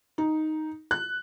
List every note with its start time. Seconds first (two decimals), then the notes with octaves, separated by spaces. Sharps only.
0.18 D#4
0.91 F#6